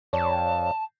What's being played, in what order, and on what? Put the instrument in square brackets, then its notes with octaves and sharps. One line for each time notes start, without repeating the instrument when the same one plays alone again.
[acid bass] F2 [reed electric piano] C#5 D5 [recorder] A5